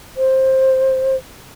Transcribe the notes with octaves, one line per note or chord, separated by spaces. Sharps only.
C5